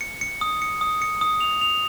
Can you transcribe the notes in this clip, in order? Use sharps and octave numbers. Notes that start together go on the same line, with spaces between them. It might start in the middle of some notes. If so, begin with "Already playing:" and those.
C#7
C#7
D#6
C#7
D#6
C#7
D#6
F7
F7